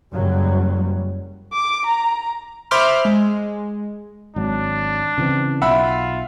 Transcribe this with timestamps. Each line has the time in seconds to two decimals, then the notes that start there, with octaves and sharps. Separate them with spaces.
0.13 F#1 F#3 G3
1.53 D6
1.86 A#5
2.71 C5 E5 B5 C6 D6 F6
3.05 G#3
4.36 G#1 F#3 D4
5.18 C#3 E3 C4
5.62 B1 F4 E5 F#5 B5